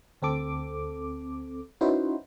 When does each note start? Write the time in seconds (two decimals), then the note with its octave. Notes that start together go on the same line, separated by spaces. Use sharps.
0.22 D2 C4 A4 D6
1.81 C#4 D#4 E4 F#4 B4 C5